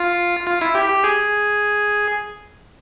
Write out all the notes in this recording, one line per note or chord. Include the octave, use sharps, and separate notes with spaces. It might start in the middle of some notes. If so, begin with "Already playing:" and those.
Already playing: F4
F4
E4
G4
G4
G#4